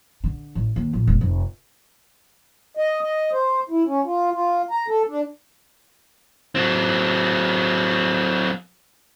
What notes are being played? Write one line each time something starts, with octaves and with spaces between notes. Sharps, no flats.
D3
A1
D#2
A#1
E1
F1
D#5
D#5
C5
E4
C#4
F4
F4
A#5
A4
D4
F#3 C4